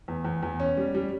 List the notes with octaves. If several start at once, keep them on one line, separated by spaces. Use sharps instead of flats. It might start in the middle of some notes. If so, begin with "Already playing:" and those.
E2
E2
E2
C#4
G3
G3